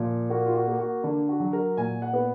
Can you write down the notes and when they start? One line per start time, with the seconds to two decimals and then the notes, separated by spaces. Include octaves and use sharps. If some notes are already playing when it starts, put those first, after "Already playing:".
Already playing: A#2 F3
0.30 A#3 F#4
0.46 F4
0.55 F#4
0.68 A#3
0.79 F#4
1.04 D3
1.29 F#4
1.40 F#3
1.53 A#4
1.77 A#2 G#5
2.02 F#5
2.13 B3